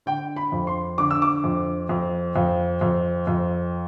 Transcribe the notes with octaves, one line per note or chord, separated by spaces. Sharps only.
D3 G5
B5
F2
C6
D3 D6
E6
D6
F2
F2
F2
F2
F2